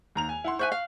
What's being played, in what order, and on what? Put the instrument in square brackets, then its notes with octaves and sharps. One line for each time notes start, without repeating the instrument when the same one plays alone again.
[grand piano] D#2 A#5 F7
G#5
E4 F#5 C6
[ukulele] C5 E5 G#5 [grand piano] C#6 F#6
[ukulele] F5